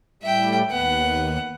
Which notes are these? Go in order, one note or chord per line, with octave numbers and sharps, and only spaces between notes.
A2 G3 E5 G5
D#2 B3 F#5